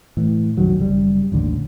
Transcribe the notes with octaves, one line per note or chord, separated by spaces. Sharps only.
A2 E3
C2 F#2 D#3 F#3
F#1 C#3 G3
A1 D#2 D3